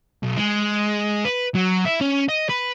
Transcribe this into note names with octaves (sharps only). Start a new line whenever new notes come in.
B1
G#3
B4
F#3
E4
C#4
D#5
B4